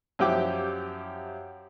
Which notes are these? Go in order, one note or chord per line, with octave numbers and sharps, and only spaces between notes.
F#2 F3 E4 G4 G5 D6